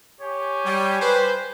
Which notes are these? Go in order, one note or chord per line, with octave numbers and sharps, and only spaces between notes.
G4 C#5 G#5
G3
B4 C5